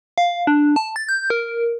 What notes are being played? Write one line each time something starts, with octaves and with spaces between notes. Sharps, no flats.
F5
D4
A5
A6
G6
A#4